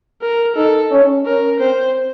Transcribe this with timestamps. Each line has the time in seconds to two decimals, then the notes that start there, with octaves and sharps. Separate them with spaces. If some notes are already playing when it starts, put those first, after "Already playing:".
0.22 A#4
0.56 D#4 A4
0.91 C#4
1.25 C#4 A#4
1.60 C4 C5